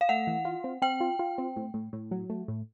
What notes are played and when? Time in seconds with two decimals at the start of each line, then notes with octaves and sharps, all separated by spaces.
0.01 F5
0.09 A3 F#5
0.27 E3
0.45 F4
0.64 C4
0.82 C4 G5
1.01 F4
1.19 F4
1.38 C4
1.56 A2
1.74 A2
1.93 A2
2.11 F#3
2.30 A3
2.48 A2